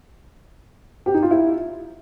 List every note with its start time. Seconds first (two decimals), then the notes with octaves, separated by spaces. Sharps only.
1.06 G4
1.14 D#4
1.23 F4
1.31 E4